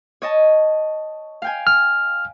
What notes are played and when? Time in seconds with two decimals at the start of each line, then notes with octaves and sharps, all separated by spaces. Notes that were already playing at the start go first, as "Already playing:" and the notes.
0.22 C#5 D#5 A5
1.42 F5 G5 G#5
1.67 F6